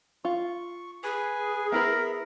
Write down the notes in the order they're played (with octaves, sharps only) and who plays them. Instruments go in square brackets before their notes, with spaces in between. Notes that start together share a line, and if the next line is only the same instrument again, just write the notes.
[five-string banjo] F4 [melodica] C#6
[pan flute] G#4 [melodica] B4 G#5
[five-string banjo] B3 E4 B4 [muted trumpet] A#4 [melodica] E5